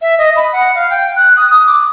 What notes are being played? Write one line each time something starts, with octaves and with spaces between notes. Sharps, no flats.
E5
D#5
B5
F#5
F5
G5
F#6
D#6
D#6
D6